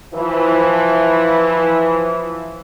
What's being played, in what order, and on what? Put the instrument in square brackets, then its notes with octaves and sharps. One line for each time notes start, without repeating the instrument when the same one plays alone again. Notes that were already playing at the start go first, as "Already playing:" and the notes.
[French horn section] E3 F3